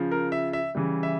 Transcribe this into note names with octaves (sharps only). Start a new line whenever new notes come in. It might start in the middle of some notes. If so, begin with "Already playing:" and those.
Already playing: C#3 F3
A#4
E5
E5
C#3 E3 G3
E5